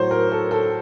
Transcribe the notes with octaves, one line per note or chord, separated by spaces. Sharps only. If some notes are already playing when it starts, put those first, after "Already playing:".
Already playing: A2 F#3 C5 C#5
A#4
A4
A4